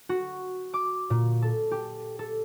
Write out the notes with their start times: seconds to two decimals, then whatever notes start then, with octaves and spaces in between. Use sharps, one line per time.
0.09 F#4
0.74 D6
1.10 A#2
1.42 A4
1.71 G4
2.19 A4